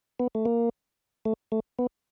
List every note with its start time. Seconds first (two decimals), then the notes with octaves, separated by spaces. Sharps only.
0.20 B3
0.35 A3
0.45 A#3
1.25 A3
1.52 A3
1.79 B3